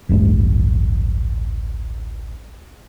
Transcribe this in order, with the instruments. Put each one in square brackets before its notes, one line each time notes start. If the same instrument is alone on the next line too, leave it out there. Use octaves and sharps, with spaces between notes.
[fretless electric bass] D1 A1 G2 G#3